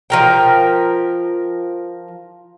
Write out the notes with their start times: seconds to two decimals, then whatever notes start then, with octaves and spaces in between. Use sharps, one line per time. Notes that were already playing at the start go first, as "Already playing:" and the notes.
0.10 F3 A#4 G5